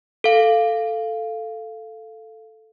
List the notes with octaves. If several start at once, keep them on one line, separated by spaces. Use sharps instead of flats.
A4 F5